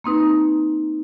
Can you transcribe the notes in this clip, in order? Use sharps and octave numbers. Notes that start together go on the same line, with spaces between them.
A#3 C4 D#4 B4